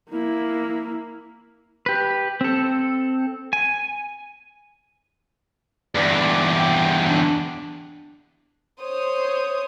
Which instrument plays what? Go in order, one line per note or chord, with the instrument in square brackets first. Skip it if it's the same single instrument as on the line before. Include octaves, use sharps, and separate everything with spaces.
[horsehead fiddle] A#3 E4
[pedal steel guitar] G4 B4
C4 A4
G#5
[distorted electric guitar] E2 G2 [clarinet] D5
[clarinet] G5
D4
[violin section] C5 C#5 D#6